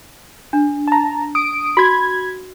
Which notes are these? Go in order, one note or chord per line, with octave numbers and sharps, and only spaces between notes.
D4
A5 A#5
D#6 D7
F#4 B5 G#6